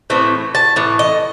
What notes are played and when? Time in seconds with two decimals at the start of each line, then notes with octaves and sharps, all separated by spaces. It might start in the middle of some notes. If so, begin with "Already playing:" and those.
0.10 A2 E3 A3 C4 E5
0.55 A5
0.76 A2 E3
0.99 D#5